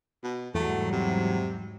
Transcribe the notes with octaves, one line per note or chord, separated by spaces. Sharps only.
B2
E2 G#2 F#3 G3 A3
C3